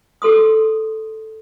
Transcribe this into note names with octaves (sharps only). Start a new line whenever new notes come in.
G4 A4 C6 D#6